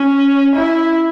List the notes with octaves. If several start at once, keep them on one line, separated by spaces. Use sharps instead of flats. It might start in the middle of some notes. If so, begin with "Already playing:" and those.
Already playing: C#4
E4